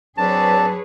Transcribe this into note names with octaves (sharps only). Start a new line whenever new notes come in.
F#3 C4 D4 G#4 B4 C#5 A5